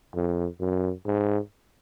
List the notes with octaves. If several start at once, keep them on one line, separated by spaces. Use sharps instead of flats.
F2
F#2
G#2